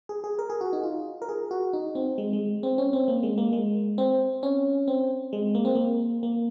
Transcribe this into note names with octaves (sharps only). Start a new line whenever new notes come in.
G#4
G#4
A#4
G#4
F#4
D#4
F4
A#4
G#4
F#4
D#4
C4
G#3
G#3
C4
C#4
C4
A#3
G#3
A#3
G#3
C4
C#4
C4
G#3
A#3
C4
A#3
A#3